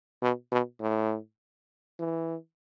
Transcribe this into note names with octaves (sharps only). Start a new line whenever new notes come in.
B2
B2
A2
E3